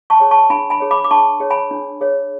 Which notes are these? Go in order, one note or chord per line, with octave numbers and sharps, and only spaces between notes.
A5 C#6
G#4 C#5
A5 C#6
D4 G#5 B5
G#5 B5
G#4 C#5
B5 D6
D6
D4 A5 C#6
G#4 C#5
G#5 B5
D4
G#4 C#5